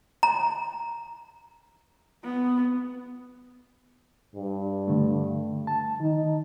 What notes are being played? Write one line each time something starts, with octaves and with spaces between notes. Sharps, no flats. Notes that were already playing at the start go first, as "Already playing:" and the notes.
A#5
B3
G2
D3 A3
A5
D#3 D#4